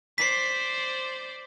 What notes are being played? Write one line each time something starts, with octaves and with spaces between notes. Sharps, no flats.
C5 D5 B6 C7